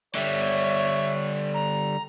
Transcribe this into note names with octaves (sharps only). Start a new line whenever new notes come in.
D3 G3 C#5 E5
A#5